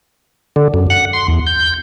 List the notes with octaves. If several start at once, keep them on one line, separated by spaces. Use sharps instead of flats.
D3
F#2
F#5
C6
E2
G6